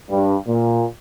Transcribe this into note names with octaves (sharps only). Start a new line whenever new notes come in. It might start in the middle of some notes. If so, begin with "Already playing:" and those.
G2
A#2